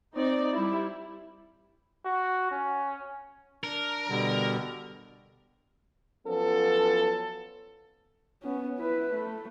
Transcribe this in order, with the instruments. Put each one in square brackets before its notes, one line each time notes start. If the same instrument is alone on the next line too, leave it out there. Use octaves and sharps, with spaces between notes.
[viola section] C4 D#4 D5
G3 E4
[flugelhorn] F#4
C#4
[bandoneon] D4 [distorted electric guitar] A#4
[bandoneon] B2 D3 G3
[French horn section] F3 F#3 B3 C#4 A4
[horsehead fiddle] B3 C#4
E4 B4
A3